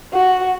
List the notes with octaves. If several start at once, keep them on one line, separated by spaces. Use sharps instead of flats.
F#4